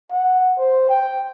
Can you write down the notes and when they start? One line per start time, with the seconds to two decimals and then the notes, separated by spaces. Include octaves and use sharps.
0.11 F#5
0.59 C5
0.89 G5